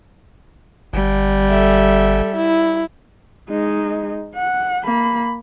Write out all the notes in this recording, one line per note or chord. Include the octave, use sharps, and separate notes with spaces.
G1 G3
A4 E5
E4
G#3 D#4
F#5
A#3 B5